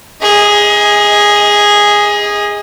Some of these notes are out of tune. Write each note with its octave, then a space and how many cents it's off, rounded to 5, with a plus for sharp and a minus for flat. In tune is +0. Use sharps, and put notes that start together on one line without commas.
G#4 -10 D#5 +30